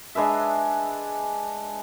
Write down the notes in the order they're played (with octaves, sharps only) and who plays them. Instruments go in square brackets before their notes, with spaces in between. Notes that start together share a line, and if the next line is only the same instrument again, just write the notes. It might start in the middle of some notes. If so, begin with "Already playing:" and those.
[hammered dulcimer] G#3 D4 B4 E5